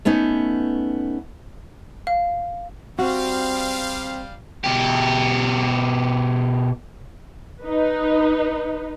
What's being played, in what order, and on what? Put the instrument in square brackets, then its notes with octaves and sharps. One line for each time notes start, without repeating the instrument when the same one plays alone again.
[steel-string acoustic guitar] A3 B3 C#4 D#4
[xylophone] F5
[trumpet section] G3 F5 [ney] C4 [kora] F#4
[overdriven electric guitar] B2 G4
[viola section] D#4 B4